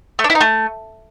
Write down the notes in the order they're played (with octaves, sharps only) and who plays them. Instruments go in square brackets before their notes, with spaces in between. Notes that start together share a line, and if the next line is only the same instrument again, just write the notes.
[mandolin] A3
D4
E4
D#4
A3